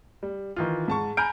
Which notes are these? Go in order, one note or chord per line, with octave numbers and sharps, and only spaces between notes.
G3
D#3 E3 F4
G#2 A5 C#6
G#5 A#5 B5 F6 G6 D7